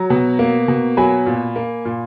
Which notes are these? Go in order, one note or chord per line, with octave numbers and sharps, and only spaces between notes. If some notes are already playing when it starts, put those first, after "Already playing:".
Already playing: F#3 A#5
B2
A#3
B2
F#3 G#5 B5
A#2
A#3
A#2